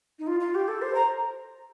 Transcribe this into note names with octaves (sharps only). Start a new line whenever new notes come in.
D#4
F4
F4
G4
A4
C5
A#5